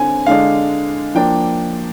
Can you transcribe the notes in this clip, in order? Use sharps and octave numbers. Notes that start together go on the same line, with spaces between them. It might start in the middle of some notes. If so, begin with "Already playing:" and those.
Already playing: D3 C4 G#5
D3 G#3 D4 F5
F3 A#3 D4 G5